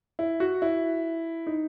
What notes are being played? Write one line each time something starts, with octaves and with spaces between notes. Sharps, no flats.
E4
F#4
E4
D#4